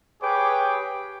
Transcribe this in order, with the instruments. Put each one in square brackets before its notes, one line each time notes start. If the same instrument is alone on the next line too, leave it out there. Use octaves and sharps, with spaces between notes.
[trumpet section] G4 G#4 B4 C#5 G5 D6